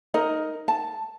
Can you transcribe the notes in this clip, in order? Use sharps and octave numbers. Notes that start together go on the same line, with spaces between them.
D#4 A#4 D#5
A5